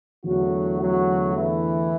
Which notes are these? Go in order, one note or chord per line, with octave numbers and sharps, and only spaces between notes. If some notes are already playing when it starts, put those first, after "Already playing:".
E2 D3 F#3 A3 F#4
F#3 F#4
E3 E4